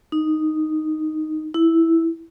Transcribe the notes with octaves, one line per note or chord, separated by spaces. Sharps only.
D#4
E4